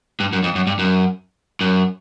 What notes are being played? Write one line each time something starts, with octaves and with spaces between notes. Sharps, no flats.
G2
F#2
F2
F#2
G2
F#2
F#2